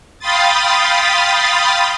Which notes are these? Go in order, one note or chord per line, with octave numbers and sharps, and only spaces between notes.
F5 G5 B5 C6 D#6 A6